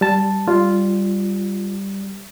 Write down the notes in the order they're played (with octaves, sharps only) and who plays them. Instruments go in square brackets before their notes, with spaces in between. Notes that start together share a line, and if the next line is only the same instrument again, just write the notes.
[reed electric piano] G3 A5
[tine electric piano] G3 [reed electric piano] F4